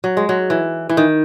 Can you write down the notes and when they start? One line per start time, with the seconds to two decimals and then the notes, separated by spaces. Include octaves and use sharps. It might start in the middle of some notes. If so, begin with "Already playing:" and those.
0.04 F#3
0.17 G#3
0.29 F#3
0.50 E3
0.89 E3
0.97 D#3